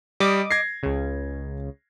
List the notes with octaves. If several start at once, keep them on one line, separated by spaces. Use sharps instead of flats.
G3 D#5 D6 D#6
G#6 A#6 C7
C#2 C#3